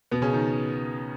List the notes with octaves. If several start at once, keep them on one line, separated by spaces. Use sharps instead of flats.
B2 B3
C#3 C#4
D#3